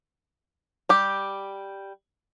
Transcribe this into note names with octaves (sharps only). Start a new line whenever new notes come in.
G3 G4